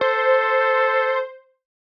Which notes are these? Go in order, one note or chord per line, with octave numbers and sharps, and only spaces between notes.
A4 C5